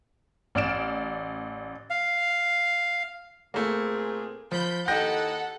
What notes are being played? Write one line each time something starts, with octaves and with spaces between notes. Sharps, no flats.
A1 D5 F6 D7 E7
F5
A#2 A3 A#3 C4 G#4
F3 B5 G6
D#2 E4 A4 D#5 F#5 G5 G6 A#6